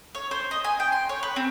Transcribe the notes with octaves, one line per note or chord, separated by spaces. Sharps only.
C#5
C5
D#5
G#5
G5
C6
C#5
B4
C4